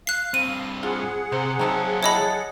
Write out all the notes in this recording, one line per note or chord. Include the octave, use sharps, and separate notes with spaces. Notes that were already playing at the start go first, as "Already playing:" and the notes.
F5 F#6 C7
G2 C4 D#7
F4 G#4 F#5
C3 C5
C3 F#3 C4 D#4 A5
E4 G4 A4 C#5 D#5 B5